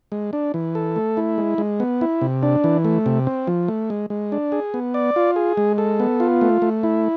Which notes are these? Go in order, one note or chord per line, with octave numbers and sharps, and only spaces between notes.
G#3
D4
E3
A4
A3
E4
G#3
G#3
B3
E4
C3
D4
E3
A3
C3
C4
F3
A3
G#3
G#3
D4
G#4
B3
D5
F4
G#4
G#3
A4
B3
F4
A3
A3
E4